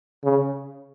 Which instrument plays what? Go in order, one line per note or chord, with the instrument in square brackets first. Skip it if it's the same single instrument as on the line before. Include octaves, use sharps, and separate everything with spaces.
[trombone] C#3